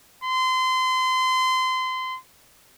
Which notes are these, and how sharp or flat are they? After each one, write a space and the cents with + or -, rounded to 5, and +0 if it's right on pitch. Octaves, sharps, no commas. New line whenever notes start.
C6 -25